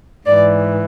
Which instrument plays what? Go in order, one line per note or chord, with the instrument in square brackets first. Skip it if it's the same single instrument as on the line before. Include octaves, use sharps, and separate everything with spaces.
[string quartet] G#2 E3 D5